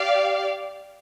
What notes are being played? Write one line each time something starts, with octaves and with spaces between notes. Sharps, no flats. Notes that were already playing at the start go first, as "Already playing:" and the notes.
Already playing: G4 D5 F5